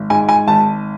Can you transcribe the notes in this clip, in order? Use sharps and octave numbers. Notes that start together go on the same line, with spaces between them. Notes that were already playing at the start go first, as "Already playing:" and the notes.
Already playing: G#1
G#2 G#5
G#5
G#1 A5